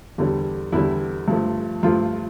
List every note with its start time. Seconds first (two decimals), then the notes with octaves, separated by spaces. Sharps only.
0.18 E2 D3 G3
0.72 E2 D3 G3 E4
1.28 G2 F3 A3
1.83 G2 F3 A3 F4